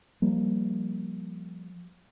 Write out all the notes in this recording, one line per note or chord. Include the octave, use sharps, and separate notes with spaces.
F3 G3 A#3